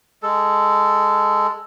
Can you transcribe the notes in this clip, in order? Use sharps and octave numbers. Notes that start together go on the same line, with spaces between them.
G#3 A4